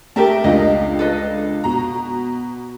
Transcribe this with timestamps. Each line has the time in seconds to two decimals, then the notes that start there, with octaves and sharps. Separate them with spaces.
0.16 A3 G4 A#4 E5 A5
0.44 C#2 D4 F4 D#5
0.99 A4 B4 D#5
1.64 B2 A#5